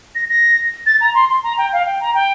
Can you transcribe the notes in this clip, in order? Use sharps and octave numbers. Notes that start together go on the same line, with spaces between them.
A#6
A#6
A6
A#5
C6
C6
A#5
G5
F5
G5
A#5
G5